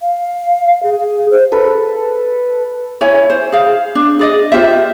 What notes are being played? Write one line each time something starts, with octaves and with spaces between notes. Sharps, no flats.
F5
G#4
C5
A4 B4
E4 C#5 E5 G#5
C5
G#4 F5
D4
G#4 D5 D#5
F4 G4 C5 E5